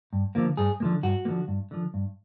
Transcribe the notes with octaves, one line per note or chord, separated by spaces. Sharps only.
G2
D3 F3 A#3
G2 G#4
D3 F3 A#3
G2 F#4
A#3
D3 F3
G2
D3 F3
G2